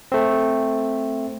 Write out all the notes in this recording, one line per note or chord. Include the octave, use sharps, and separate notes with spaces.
A3 C4